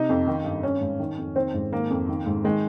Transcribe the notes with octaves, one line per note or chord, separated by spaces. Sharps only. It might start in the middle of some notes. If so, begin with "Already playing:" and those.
Already playing: C3 D#4
F2
D#3
G2
D#3 C#4
G#2
D#3
F2
D#3 C4
G#2
D#3 A#3
F2
D#3
G#2
D#3 G#3